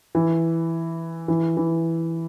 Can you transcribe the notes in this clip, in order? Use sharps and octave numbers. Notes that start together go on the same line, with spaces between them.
E3
E3
E3